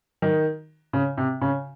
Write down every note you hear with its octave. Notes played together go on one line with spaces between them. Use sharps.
D#3
C#3
C3
C#3